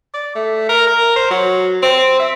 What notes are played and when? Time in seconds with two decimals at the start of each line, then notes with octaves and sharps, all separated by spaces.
0.14 D5
0.35 A3
0.69 A#4
0.87 A#4
1.16 C5
1.31 F#3
1.83 C4
2.20 E5